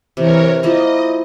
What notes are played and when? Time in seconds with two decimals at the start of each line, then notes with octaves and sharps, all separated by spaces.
0.17 C3 E3 A#4 C#5
0.63 F3 A#3 E4 D#5